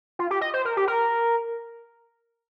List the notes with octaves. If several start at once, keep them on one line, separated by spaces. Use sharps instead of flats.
F4
G4
D#5
C5
A#4
G4
A#4